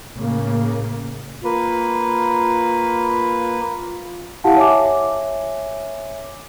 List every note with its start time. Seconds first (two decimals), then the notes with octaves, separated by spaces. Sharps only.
0.16 A2 C#3 A#3
1.44 A#3 F4 B4
4.44 E4 G4 F5 F#5 A5
4.57 C#5 E5 G#5 D6